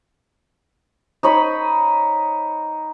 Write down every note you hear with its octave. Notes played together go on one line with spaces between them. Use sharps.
D#4 C#5 D#5 B5